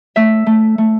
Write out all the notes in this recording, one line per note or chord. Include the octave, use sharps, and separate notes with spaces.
A3 E5
A3
A3